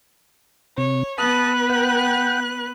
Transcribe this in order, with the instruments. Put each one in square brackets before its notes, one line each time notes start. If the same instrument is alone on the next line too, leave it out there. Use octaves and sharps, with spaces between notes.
[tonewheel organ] C3 [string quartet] C#5
[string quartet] B3 B4 F#6 [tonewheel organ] A5 D#6
[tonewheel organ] F#5 G5